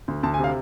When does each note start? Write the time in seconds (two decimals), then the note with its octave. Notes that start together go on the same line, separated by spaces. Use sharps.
0.08 D2
0.23 D2 A5
0.34 G#5
0.38 C3
0.44 F5